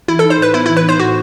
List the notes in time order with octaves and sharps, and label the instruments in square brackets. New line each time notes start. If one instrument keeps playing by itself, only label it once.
[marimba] E3 [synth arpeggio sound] E4
[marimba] D#4 [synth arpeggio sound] A4
[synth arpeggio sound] C5
[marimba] A2 [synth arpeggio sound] B4
[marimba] B3 [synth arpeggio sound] E4
[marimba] E3 [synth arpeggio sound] E4
[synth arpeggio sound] B4
[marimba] D#4 [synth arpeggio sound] C5
[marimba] A2 [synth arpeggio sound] F#4